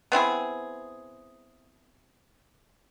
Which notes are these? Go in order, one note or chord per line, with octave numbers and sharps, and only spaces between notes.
B3 C4 E4 G#4